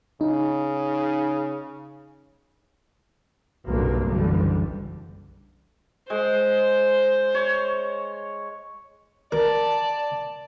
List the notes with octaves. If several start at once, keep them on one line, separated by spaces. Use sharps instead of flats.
C#3 D#4
F#1 B1 G2 C3 A#3
F#1 B1 F#2 D3 E3 G3
G#3 C5
C#5
A#4 D5 A5